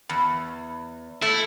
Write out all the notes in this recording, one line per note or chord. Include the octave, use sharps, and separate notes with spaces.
E2
A3 E4